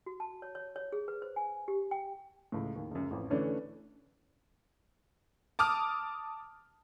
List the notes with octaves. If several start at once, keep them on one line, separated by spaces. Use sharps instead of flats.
F#4
A5
C#5
C#5
C#5
G#4
B4
C5
G#5
G4
G5
C#2 A2
D#2
C#2 F#2
A1 F2
D3 E3 A3 C#4 D4
A5 D6 D#6 F6